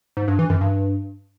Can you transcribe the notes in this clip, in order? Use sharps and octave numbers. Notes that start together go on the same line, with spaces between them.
G#2
G2
E3
F#2
G2